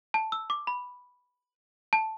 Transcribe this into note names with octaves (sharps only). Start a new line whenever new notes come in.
A5
E6
D6
B5
A5